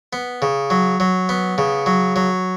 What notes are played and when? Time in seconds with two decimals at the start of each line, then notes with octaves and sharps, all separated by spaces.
0.13 B3
0.42 C#3
0.70 F#3
1.00 F#3
1.29 B3
1.58 C#3
1.86 F#3
2.16 F#3